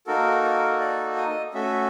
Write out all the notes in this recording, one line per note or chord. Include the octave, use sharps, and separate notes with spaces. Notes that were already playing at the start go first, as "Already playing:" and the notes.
A#3 D#4 F#4 A4 A#4
A#4
D5
D#5
A3 C#4 F#4 A4 E5